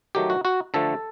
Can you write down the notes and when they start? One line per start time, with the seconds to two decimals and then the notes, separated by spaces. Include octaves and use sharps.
0.15 D#3 F#3 A3 G4
0.30 F#4
0.45 F#4
0.74 D3 F3 A3 A4